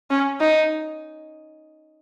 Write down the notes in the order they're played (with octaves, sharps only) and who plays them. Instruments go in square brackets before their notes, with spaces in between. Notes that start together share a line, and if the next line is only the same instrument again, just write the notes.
[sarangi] C#4
D#4